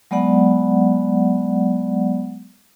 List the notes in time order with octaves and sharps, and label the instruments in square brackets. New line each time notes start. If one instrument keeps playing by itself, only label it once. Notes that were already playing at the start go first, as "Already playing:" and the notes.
[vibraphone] F#3 G#3 B3 D5 F#5